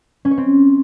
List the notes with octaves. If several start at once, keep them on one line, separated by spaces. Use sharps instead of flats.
C#4
C#5
C4